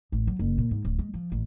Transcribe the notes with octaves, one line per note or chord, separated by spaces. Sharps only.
A1
F#3
F#1
A#2
G#2
D1
G#3
F3
A1